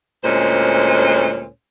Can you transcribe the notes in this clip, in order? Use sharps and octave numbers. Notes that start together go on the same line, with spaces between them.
D2 A#2 G#3 C#4 C5